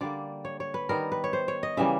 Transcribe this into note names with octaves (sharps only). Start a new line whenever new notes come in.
D3 G3 A#3 D5
C#5
C#5
B4
D#3 G3 B3 A#4
B4
C#5
C5
C#5
D#5
C#3 E3 G3 A#3 E5